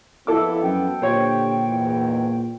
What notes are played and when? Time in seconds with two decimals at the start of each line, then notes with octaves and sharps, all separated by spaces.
0.27 F2 B3 E4 A4 D6
0.62 F#2 G5
1.02 A#2 D3 G4 C5 C#5
1.67 E2 G#2 E3